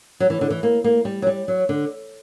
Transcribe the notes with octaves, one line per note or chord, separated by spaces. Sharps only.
F#3
E3
D3
E3
A#3
A#3
G3
F#3
G3
F#3
D3